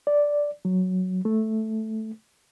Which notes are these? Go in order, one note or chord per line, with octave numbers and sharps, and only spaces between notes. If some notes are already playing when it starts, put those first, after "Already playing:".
D5
F#3
A3